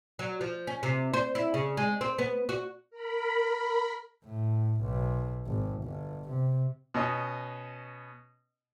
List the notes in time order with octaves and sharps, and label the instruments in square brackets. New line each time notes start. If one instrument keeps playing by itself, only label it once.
[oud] F#3
F3
C#4
C3
C5
E4
C#3
G#3
C4
B3
F#4
[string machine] A#4 B5
[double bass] A2
B1
G#1
G1
C3
[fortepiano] B2 C#4 D#5